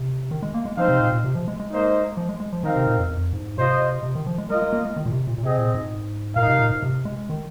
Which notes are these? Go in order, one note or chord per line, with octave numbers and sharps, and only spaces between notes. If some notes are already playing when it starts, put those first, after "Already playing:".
Already playing: C3
D#3
G#3
A#3
G#3
F3 C4 D#4 C5 F5
C3
A#2
A#2
C3
F3
G#3
G#3
A#3 D#4 C5 D#5
F3
G#3
G#3
F3
D#3 C4 D#4 A#4 F5
C3
A#2
F2
F2
G#2
C3 F4 C5 D#5
C3
D#3
F3
G#3
G#3 F4 A#4 D#5
G#3
A#3
G#3
D#3
A#2
C3
A#2
A#2
C3 C4 G#4 D#5
A#2
G#2
A#2 D#4 A#4 F5
C3
A#2
G#2
C3
G#3
D#3